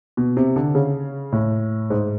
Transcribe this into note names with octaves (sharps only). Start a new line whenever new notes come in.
B2
C3
D3
C#3
A2
G#2